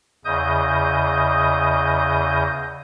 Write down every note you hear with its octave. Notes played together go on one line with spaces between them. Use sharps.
E2 C#3 D#5 D#6 G6